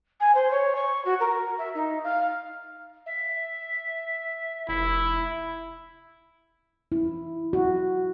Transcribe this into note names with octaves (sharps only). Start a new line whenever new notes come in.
G#5
C5
C#5
C#6
F#4
A#4
E5
D#4
F5
E5
F1 E4
E4
F#4